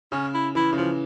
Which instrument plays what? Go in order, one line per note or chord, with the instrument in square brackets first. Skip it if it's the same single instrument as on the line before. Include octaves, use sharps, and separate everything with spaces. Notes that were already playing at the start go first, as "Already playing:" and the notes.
[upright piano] C#3 [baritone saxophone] C#4
[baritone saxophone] E4
[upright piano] E3 [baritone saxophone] E4
[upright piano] C#3
[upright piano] E3 [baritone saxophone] F3